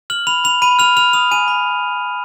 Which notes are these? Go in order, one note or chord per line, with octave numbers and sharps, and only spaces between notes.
F6 F#7
B5 F7
B5 F7
B5 D#7
F6 F7
F6 F7
D#6 F7
G#5 D#7
B5